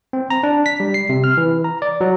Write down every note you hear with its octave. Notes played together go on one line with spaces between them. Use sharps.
C4
A#5
D4
B6
G3
C7
C3
F6
E3
A#5
D5
F#3